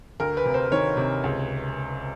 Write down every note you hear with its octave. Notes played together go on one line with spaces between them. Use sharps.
D2 A#4
B4
C3
C5
D#3 C#5
C3
C#2